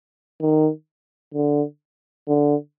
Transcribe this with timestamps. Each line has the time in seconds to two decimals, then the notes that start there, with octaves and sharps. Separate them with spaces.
0.41 D#3
1.34 D3
2.27 D3